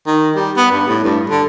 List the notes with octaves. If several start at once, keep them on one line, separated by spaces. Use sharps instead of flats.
D#3
G3
B3
G2
A2
G2
D3